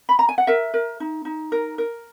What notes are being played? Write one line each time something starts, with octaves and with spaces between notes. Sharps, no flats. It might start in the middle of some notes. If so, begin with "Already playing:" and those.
B5
A#5
G#5
F#5
A#4 E5
A#4
D#4
D#4
A#4
A#4